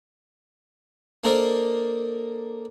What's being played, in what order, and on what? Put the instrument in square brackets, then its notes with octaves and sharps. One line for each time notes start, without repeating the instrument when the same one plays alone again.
[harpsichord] A#3 D4 A4 A#4 C5 D#5